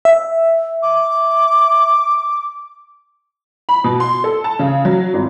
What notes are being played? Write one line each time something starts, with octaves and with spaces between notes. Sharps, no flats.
E5
D6
B5
B2
C6
A4
A5
C#3
F#3
G#1